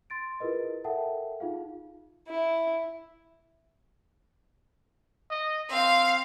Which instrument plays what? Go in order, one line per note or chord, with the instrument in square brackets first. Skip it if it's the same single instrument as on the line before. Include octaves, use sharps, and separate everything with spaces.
[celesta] C6 A6 D7
E4 F4 G#4 A#4 B4 D#5
A4 A#4 E5 F#5 G5 A5
D#4 F4 G#4 F5
[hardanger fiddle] E4
[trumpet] D#5
[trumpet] C4 [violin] F5